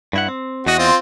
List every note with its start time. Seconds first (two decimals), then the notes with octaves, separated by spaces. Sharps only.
0.13 G2 E4 F#5
0.28 C4
0.66 E2 F#4 D#5
0.78 C4 F4